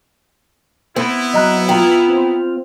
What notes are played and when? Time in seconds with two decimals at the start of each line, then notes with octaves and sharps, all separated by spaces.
0.96 B3 C4 E4
1.34 F#3 D#5 A#5 F#6
1.69 F4 G5 A#5
2.08 C4